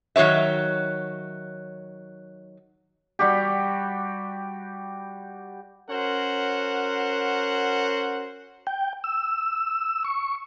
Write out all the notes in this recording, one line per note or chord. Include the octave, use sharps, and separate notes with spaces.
D#3 F#3 A4 C#5 E5
G3 F#4 G4
C#4 F#4 A#4 C5 F#5
G5
E6
C#6